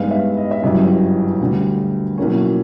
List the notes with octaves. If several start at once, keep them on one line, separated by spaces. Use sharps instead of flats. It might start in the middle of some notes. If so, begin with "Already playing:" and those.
Already playing: G2 D#3 G#3 B3 F5
E5
D#5
E5
G1 F#2 C#3 E3 G3 D#5
D2 D3 G3
B1 A2 F3 A#3 C#4